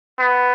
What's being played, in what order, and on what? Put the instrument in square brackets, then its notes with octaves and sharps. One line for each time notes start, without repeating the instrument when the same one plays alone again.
[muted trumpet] B3